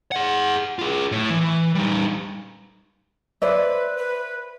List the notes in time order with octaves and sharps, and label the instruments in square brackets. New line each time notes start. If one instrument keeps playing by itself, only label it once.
[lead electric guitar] G#4 F#5
F4 G#4
A2
E3
G3 D#4
[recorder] B4 [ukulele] C5 D5 E5
[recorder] B4